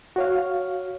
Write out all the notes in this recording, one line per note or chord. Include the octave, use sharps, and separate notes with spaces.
F#4 C#5 F5